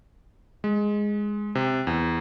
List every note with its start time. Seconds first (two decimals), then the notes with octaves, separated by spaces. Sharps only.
0.64 G#3
1.55 C3
1.87 E2